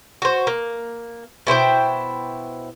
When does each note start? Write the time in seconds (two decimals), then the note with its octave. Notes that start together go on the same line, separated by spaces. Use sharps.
0.22 F#4 C5
0.47 A#3
1.47 B2 E4 C5 G5